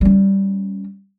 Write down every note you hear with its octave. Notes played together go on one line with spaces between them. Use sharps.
G3 C#4